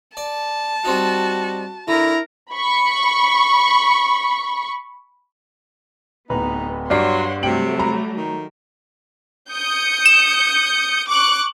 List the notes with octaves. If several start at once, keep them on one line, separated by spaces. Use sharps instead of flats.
D5 A5
G3 C4 D#4 F#4
D3 E4 A#4 A#5
B5 C#6
D1 B3 D#4 B4 A#5
G2 F#3 C#5 D5 F#5 C6 F6 C7
C3 F#3 G3 A3 G5 D7 F#7
A#5 B5
D#3
D#6 G6 C#7
E7
C#6 D6 F#6